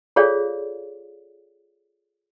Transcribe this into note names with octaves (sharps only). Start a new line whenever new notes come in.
F4 G#4 A4 C#5 D5 F5